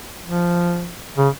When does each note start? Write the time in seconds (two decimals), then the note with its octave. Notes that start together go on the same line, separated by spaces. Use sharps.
0.25 F3
1.18 C#3